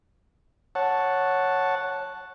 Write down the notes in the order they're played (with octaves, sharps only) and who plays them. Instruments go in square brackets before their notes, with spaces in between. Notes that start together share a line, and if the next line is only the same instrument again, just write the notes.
[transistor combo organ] C#5 F#5 A5